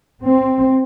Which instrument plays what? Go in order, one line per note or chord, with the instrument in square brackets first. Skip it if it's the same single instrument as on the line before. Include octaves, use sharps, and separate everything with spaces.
[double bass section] C4